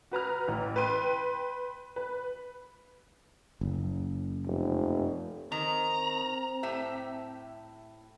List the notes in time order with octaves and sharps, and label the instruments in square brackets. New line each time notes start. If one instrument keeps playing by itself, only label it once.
[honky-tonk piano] F#4 B4 A#5 F6
A1
B4 G5 C6 D#7
B4
[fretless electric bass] F#1
[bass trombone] F1
[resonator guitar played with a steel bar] D#3 [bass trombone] C4 [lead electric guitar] A#5
[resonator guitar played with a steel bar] A2 G4 E5